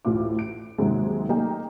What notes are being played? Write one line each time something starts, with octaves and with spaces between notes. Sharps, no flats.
A1 D2 A2 F4 D6
D7
D#2 G#2 C3 D#3 F#3 G#3
A3 A#3 D#4 G#4 G5